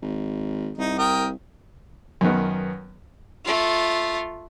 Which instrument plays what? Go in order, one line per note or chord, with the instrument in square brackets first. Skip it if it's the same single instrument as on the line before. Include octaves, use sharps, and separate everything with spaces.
[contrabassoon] G#1
[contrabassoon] C2 [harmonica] D#4
[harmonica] A#4 G5 D#6
[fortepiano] F#2 D#3 B3
[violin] A3 F4